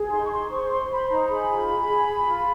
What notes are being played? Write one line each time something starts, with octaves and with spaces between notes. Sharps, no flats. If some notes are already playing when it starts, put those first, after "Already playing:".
Already playing: G#4
D#4 C6
C#6
D#4 C6
C5 C#6
C5 C6
C5 B5
D#4 A#5
G#4 B5
F4
G#4
G#4
G#4
F4